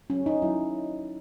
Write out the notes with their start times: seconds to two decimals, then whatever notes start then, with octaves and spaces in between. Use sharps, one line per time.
0.10 F#3 C#4
0.26 D#4
0.42 F#3 E4